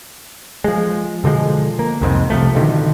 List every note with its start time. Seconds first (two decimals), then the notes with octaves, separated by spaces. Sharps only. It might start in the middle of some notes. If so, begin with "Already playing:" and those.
0.64 F3 G#3
1.24 B2 D3 F3 G#3
1.79 A#3
2.01 C2 F2 G#2 C3
2.30 C3 F3 A3
2.55 G2 B2 D3 D#3